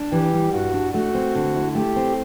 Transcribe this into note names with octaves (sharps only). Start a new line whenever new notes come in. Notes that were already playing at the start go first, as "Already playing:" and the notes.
Already playing: D4
E3 G4
G3
G2 F#4
D4
A3 F#4
C4
D3
E4
A3 G4
C4